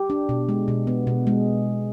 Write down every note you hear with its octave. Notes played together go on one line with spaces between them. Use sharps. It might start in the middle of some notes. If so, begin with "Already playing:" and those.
Already playing: G4
D4
B2
G#3
B2
B3
B2
G#3